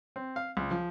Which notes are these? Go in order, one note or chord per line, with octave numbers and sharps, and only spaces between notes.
C4
F5
C#2
F3